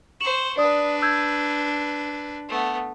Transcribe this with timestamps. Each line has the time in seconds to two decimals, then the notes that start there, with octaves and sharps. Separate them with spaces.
0.21 C5 C#6 E7 F#7
0.58 D4 B4 D5 D#6
1.02 E6 G6 G#6
2.49 A3 B3